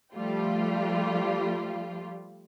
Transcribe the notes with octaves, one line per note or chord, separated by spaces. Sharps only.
F3 G3 A3 F4 G4